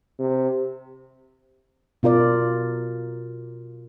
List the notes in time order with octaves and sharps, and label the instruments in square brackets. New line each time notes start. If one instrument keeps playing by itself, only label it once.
[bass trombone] C3
[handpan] B2 F4 A#4 D5